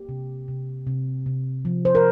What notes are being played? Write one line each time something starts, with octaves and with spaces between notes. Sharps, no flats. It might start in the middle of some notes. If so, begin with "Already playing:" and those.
Already playing: A#3 G4
C3
C3
C3
C3
F3
C5
A#4